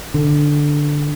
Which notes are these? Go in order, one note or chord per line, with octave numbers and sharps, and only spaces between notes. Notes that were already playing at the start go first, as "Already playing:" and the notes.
D3